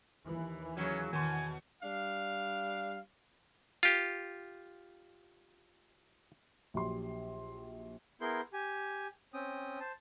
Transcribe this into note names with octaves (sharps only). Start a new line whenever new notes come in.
D#2 E3
C#3 F#3 C#4
E2 B2 D#3 G#5 C6
G3 D4 F5
F4 G4
A#1 F#3 G4 C6
B3 E4 G#4 A#4 C6 G6
G4 G#5
C4 C#4 G5 D#6
C5 A5